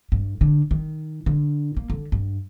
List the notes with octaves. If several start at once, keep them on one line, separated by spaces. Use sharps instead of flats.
G2
D3
D#3
D3
A#3
D3
G2